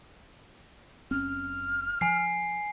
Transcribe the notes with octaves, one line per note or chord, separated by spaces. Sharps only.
F#1 C4 C#4 F6
F3 G#5 C7